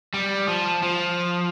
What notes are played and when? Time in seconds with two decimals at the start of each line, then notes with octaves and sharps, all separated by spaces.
0.14 G3
0.48 F3
0.83 F3